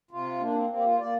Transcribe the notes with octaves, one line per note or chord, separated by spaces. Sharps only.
C3 F4
A#3 D4
C4
A#3 C4
G4
F4
A#3 D5